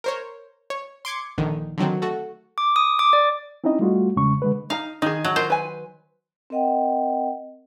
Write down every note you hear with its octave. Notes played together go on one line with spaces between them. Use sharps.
A#4 C5 C#5
C#5
C6 D6 G#6 C#7
A#1 D3 D#3
D3 D#3 F#3 C4
A3 F#4 A4
D6
D#6
D6
D5
C4 C#4 D#4 E4 D#5
G3 A3 F4 F#4
E2 C#3 G#3 C#4 C#6
D3 G#3 B4
D#4 F5 A#5
D#3 D#4 G#4
F#3
F4 A#4 C5 D#5
B4 G#5
C4 A#4 D#5 F#5 G5